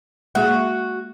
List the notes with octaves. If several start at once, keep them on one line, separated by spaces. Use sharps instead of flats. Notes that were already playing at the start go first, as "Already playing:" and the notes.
G#3 A#3 F#4 G#4